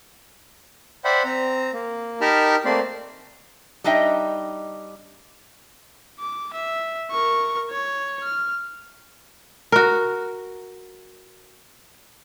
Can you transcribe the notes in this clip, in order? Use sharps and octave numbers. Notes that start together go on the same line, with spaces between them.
C5 D5 E5 F#5 G5 B5
C4 A#5
A#3
D#4 G4 A#4 A5 B5 F6
A3 A#3 C4 D5 C6
G3 D4 D#4 D#5 E5 G5
D6
E5
A#4 C#6
C#5
F6
F#4 A#4